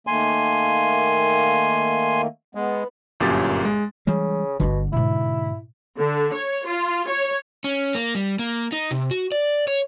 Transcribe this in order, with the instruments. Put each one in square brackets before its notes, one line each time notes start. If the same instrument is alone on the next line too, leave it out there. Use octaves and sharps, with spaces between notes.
[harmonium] D#3 A3 A#3 [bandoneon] G#5 C6
[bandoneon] G#3 [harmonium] B3
[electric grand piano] G1 F#2 A#2 G4 A6
G#3
[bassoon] C#3 [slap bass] E3 G3 G#3
[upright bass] G1 D4 [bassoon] B2 [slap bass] D3
[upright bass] G#2 B2 [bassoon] E4
[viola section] D3
C#5
F4
C#5
[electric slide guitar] C#4
A#3
G3
A#3
D#4
C3
F#4
D5
C#5